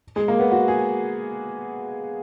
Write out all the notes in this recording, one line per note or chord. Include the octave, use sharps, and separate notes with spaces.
G#3
A#3
B3
F#4
G#4